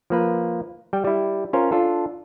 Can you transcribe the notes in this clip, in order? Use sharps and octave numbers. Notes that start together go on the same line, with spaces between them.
F3 A#3 B4
G3 G5
G3 E4
C#4 F4 A#4 C5
D4 F4 A4